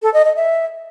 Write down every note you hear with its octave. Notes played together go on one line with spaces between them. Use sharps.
A4
D#5
D#5
E5